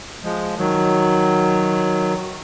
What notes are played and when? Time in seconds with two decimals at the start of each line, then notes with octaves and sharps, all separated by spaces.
0.24 F3 G#3
0.58 D#3 F#3